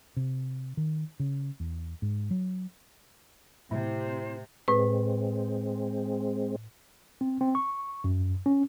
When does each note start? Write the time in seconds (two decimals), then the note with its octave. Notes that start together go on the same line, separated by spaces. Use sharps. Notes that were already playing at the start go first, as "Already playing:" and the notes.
0.17 C3
0.77 D#3
1.20 C#3
1.60 E2
2.02 G#2
2.31 F#3
3.71 A2 C3 E4 C5
4.68 A2 G#3 C4 B4
7.21 C4
7.41 C4
7.55 C#6
8.04 F#2
8.46 C#4